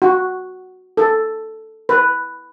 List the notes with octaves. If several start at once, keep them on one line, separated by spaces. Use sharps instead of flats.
F#4
A4
B4